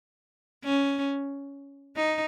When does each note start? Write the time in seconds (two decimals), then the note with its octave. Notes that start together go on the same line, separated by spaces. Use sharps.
0.64 C#4
1.96 D#4